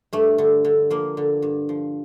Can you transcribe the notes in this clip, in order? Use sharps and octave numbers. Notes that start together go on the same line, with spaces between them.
G2 A3
D3
D3
F3 A#3
D3
G2
F3